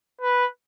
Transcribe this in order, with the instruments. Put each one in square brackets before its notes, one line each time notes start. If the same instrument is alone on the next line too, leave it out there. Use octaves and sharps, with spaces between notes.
[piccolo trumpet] B4